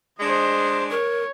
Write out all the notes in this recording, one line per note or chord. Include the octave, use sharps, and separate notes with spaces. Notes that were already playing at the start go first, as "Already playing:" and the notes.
G#3 D4 C5 D#5
A#4 C#5